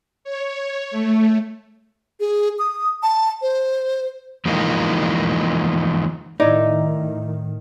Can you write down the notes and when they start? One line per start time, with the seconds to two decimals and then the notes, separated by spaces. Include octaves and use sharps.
0.24 C#5
0.91 A3
2.20 G#4
2.59 D#6
3.03 A5
3.42 C5
4.45 E2 E3 F3 G#3 A#3 D#4
6.40 A2 D#3 D#4 E4 D5